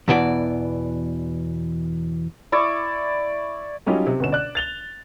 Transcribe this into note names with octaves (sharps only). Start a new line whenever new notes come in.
E2 B2 E3 D5
E4 D5 C#6
F#3 G3 C#4 D#4 F4 G4
C3
G1 B2 C#4 E7
D5 F#6
A6 F7 G7